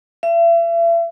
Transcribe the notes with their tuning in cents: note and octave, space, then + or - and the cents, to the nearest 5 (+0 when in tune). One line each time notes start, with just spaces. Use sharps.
E5 +40